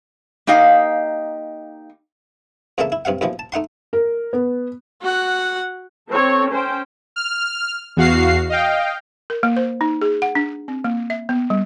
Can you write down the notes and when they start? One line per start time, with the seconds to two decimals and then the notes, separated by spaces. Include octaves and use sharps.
0.47 A#3 D#4 G4 D#5 F5
2.78 E2 C#3 E3 A#3 A4 E5
2.92 E4
3.05 G2 C3 F5 F#5
3.21 D#2 B2 E3 F3
3.39 A5
3.52 A3 D#4 F#5 C6
3.93 A#4
4.33 B3
5.02 F#4 F#5
6.10 C4 A4 C#5
6.51 C#4 C5 G5
7.16 F6
7.97 E2 F#4 F5 C7
8.50 D#5 F5 G5
9.30 A#4
9.43 A#3
9.56 C5
9.81 D#4
10.02 G#4
10.22 F#5
10.35 D4
10.68 C4
10.84 A#3
11.10 E5
11.29 B3
11.50 G3